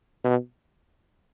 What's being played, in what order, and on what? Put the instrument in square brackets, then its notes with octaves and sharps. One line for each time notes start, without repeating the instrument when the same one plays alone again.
[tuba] B2